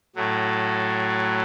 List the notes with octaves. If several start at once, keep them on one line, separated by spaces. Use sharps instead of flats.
A2 F#3 A3